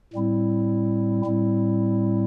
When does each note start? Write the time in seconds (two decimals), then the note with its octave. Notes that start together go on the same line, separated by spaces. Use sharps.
0.14 A2 G3 C4 E4
1.26 A2 G3 C4 E4